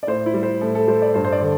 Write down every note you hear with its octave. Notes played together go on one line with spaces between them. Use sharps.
D5
A2 C5
E4
G3
C5
A2 A4
A4
G3 C5
D5
G2 C5
C5
D5
D3 A4